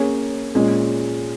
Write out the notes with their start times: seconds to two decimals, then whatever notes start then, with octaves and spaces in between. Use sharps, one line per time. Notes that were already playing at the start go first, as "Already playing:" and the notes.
Already playing: A#3 C#4 G#4 C#5
0.55 A#2 G#3 C#4